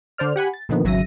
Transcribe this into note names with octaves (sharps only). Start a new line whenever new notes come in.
D3 C5 D5 F6
G4 F#5 G#5 B5
A6
A#2 D3 D#3 F3 B3
G#1 C#3 F#3 E5 A#6 D#7